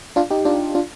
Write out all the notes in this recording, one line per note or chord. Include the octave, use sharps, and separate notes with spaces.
D4 F4
D#4 G4
D4 F4
D4 F4